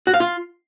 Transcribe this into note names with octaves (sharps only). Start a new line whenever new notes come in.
F#4
F5
F4